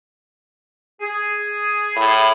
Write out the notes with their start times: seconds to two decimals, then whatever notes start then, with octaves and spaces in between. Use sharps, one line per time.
1.01 G#4
1.96 A2 B5